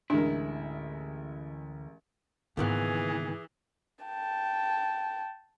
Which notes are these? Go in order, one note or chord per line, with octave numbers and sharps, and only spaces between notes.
A1 D2 G#3 D4 E4 A#4
C#2 G#2 D#3 E3 A#3 B3 G#4
G5 A5